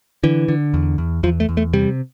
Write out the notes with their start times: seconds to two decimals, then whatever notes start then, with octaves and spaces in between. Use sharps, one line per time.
0.23 D3 E3
0.48 D3
0.74 E2
0.98 E2
1.23 E2 F3
1.40 A3
1.49 E2
1.57 A3
1.73 C3 G3